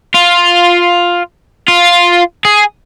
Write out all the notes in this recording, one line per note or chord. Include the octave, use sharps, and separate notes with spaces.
F4
F4
G#4